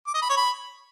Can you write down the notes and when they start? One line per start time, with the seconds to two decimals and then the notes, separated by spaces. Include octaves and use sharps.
0.07 D6
0.14 D#5
0.22 B5
0.29 C#5
0.37 B5